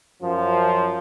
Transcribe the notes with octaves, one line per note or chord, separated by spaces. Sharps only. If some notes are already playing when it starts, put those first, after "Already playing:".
F#2 F3